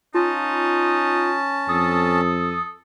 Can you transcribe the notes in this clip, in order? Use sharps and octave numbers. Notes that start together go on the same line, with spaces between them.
C#4 D#4 F4 A5
F2 A4 D#6